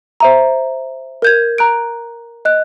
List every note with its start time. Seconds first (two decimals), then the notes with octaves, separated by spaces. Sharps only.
0.20 C5 E5 A#5
1.22 A#4 G6 G#6
1.58 A#5 F#6 D7
2.45 D#5 F#6